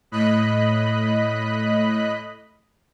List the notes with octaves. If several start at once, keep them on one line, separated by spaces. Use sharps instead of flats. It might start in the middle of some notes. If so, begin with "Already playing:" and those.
A2 D#5 B5 F#6